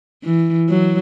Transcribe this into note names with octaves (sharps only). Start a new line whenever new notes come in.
E3
F#3